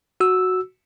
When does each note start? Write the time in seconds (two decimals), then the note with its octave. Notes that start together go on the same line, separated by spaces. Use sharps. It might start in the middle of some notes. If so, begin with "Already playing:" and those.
0.20 F#4 E6